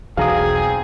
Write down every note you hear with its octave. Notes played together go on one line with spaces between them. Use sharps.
E1 B1 E2 C4 G#4 F5 A#5 D#6